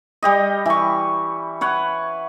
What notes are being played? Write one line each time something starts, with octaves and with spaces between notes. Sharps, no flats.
G3 G4 D#5
E3 C#6
B4 C#5 F#5